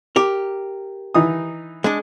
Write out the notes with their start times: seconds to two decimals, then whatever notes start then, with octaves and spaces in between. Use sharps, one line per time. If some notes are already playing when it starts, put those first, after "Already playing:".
0.16 G4 A#4
1.14 E3 D#4 D#6
1.84 G#3 D4